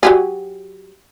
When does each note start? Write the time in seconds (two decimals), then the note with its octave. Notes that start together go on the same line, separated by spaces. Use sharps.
0.03 F#3 G4 G#4